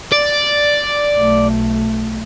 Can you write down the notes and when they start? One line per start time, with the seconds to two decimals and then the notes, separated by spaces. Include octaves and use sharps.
0.12 D5
1.17 B1 A3